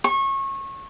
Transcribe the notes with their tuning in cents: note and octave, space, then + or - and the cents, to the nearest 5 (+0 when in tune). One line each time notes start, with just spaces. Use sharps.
C#6 -25